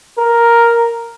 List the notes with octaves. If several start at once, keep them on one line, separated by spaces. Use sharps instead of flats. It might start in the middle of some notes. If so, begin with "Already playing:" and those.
A#4